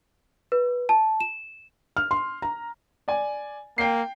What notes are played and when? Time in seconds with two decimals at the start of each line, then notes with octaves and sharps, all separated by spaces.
0.52 B4
0.89 A5
1.21 E7
1.97 F6
2.11 C6
2.42 A#5
3.08 D5 G#5
3.78 A#3 G5 C7